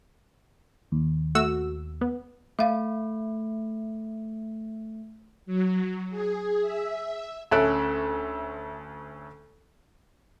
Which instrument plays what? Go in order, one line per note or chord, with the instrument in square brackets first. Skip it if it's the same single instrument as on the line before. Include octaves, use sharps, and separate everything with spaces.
[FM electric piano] D#2
[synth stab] A3 F#4 E6
B3
[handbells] A3 [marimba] E5 F5
[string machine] F#3
G#4
E5
[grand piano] D2 C#4 A4 E5 F#6 D7